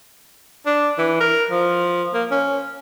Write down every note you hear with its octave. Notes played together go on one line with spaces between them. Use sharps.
D4
E3
A#4
F3
A#3
C#4